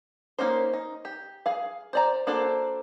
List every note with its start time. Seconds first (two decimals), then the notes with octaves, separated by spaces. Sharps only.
0.39 A#3 C#4 D#4 A#4 C5
0.73 D#4
1.05 G4
1.46 G#4 F5
1.93 C5 D5 A#5
2.27 A#3 D4 F#4 A4 C5